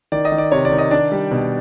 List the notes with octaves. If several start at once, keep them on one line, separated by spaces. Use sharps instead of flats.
D#3 D5
D#5
D#3
D5
C3 C#5
D5
D#3
D#5
D4 D5
G3
B2